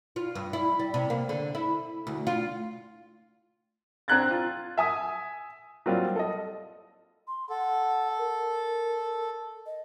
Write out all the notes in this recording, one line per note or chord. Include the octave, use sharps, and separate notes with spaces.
F4
G2
E4
G3
C3
A#3
D3
E4
D2
F4
C4 D4 A#5 F#6 G#6 A6
F4
E5 G#5 D#6
F#3 G3 A#3 C4 F4
A4 D#5
C6
A4 F#5
A#4
D#5